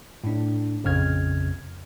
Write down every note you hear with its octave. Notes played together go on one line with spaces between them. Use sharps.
A2 D4
A#1 F2 C#3 F6 G#6